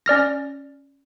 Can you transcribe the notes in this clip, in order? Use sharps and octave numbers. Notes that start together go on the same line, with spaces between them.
C#4 D5 F6 A#6